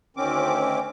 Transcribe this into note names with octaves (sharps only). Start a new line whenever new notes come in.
D2 D#3 C4 C#4 D6